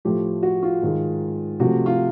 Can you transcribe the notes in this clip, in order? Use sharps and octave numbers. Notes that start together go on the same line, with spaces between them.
A2 F3 A3 G4
F#4
F4
G#2 D#3 G#3
C3 F3 A3 F#4
F4